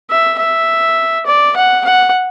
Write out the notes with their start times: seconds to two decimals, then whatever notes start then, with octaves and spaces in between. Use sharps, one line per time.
0.10 E5
0.39 E5
1.26 D5
1.56 F#5
1.85 F#5